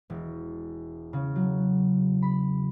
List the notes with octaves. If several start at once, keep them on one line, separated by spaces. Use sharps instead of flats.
E1
C#3
F#3
B5